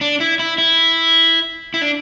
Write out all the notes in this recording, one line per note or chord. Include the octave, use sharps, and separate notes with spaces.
D4
E4
E4
E4
E4
D4